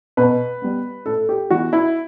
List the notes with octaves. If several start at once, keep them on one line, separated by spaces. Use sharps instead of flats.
B2 B4
G3 B3
A2 A4
G4
E3 B3 F#4
E4